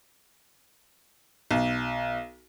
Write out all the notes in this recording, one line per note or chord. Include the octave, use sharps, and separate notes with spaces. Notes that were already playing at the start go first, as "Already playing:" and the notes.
B1